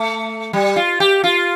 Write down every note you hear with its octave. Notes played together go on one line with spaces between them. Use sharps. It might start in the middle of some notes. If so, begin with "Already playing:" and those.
Already playing: A3
G3
F4
G4
F4